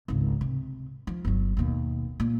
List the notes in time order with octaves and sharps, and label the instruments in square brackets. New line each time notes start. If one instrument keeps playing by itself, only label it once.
[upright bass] G#1 C#2
C3
F3
G1 F#3
D#2 B2
A#2